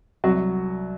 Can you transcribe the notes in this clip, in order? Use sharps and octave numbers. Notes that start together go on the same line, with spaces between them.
C2 F#3 F#4